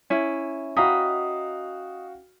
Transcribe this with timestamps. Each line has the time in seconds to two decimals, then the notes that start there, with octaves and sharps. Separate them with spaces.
0.10 C#4 E4
0.77 F#4 D#5 F5 G5 A#5 B5